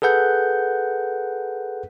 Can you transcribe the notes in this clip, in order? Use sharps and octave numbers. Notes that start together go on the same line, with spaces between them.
G#4 A4 B4 F#5 G6